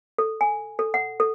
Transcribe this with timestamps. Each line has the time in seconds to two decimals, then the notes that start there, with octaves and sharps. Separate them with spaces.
0.18 A4
0.41 G#5
0.79 A4
0.94 F#5
1.20 A4